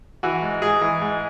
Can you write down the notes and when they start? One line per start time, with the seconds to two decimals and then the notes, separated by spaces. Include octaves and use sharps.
0.23 E3 F#4
0.42 G#2
0.62 G#2 G#4
0.82 E3
1.02 G#2